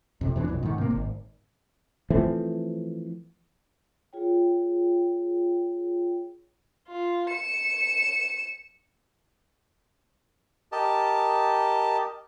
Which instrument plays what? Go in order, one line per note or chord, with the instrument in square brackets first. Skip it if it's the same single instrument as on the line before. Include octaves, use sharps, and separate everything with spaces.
[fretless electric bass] F2 C3
E2 E3 B3 D4
B1 F2
G#2 D#3
C3 A#3
G#1
E3 F3 A3 C4
[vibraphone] F4 G#4 C#5 G5
[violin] F4
C#7 E7
[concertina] G4 A#4 D#5 A5